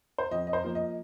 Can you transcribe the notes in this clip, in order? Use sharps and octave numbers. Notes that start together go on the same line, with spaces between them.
C5
F2 D#5
D#5
C5
F3 A#3
D#5